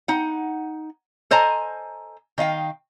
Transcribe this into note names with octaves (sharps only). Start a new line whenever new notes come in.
D#4 F#5
A4 C5 D#5 G#5 A#5
D#3 D#5 F5 G5